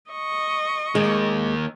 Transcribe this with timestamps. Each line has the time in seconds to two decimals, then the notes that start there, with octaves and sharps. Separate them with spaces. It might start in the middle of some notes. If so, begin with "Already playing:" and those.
0.11 D#5 C#6
0.95 D#2 D#3 G#3